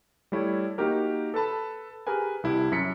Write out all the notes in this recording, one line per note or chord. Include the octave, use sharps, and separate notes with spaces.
G3 A3 E4 C#5
A#3 D#4 F#4 G4 A#4
A4 B4 A5 B5
G4 G#4 A#4 B4 G#5
C2 E4 G4
F#2 E5 B6 C#7